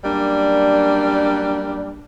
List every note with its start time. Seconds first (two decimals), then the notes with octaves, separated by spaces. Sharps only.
0.04 F#2 G3 A#3 D4